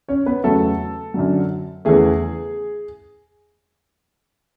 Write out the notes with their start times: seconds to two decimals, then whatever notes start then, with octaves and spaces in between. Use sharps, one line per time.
0.09 C#4 C#5
0.26 B3 B4
0.44 E2 C#3 F#3 A3 A4
1.14 F#2 D3 F#3
1.85 E2 C#3 E3 A3 G#4